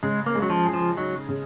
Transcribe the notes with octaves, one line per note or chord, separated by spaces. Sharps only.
C#3 G#3
A#3
G#3
F#3
F3
G#4
F3
F#3 D#4
C#3